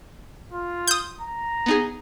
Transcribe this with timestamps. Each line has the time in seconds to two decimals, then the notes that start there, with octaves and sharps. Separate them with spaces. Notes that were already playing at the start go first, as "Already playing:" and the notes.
0.52 F4
0.87 D#6 G6
1.21 A#5
1.66 B3 D#4 G#4